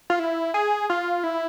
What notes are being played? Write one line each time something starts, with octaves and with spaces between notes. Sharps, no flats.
F4
E4
G#4
F4
E4